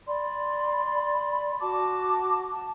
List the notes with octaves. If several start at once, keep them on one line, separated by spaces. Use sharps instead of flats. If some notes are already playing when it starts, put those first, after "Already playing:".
D5 B5 C6
F#4 A5 D6
A5